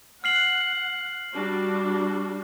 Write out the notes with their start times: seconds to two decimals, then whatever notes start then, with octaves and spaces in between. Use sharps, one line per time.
0.24 F#5 F6 C7 F#7
1.33 G3 D4 F#4